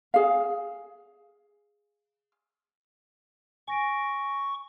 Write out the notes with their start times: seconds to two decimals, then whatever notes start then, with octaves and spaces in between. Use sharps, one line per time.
0.14 G#4 F5
3.68 G#5 C#6 A#6 D7